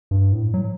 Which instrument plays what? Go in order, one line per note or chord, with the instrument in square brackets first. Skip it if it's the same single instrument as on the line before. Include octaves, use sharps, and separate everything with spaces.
[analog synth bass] G2
A2
F#3